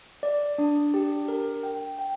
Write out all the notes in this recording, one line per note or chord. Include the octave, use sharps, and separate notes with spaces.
D5
D4
G4
A#4
G5
G5